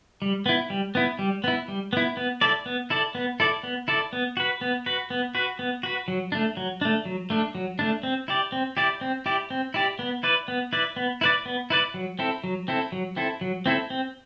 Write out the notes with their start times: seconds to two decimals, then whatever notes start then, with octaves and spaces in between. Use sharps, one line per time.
0.22 G3
0.46 B3 E4
0.70 G3
0.95 B3 E4
1.19 G3
1.44 B3 E4
1.68 G3
1.93 B3 E4
2.17 B3
2.41 E4 A4 D5
2.66 B3
2.90 E4 A4 D5
3.15 B3
3.40 E4 A4 D5
3.63 B3
3.88 E4 A4 D5
4.13 B3
4.37 F#4 B4
4.61 B3
4.86 F#4 B4
5.10 B3
5.35 F#4 B4
5.59 B3
5.83 F#4 B4
6.08 F#3
6.32 A3 D4
6.57 F#3
6.81 A3 D4
7.05 F#3
7.30 A3 D4
7.55 F#3
7.79 A3 D4
8.03 C4
8.28 E4 G4 D5
8.52 C4
8.77 E4 G4 D5
9.01 C4
9.26 E4 G4 D5
9.50 C4
9.74 E4 G4 D5
9.99 B3
10.23 E4 B4 D5
10.48 B3
10.73 E4 B4 D5
10.96 B3
11.21 E4 B4 D5
11.46 B3
11.70 E4 B4 D5
11.94 F#3
12.19 C4 E4 A4
12.44 F#3
12.68 C4 E4 A4
12.92 F#3
13.16 C4 E4 A4
13.41 F#3
13.66 C4 E4 A4
13.90 C4